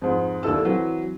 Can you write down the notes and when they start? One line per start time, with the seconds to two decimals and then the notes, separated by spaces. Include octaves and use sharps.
0.02 F2 G#2
0.43 D#2 D4 E4 A4 E6
0.64 E3 F#3 C4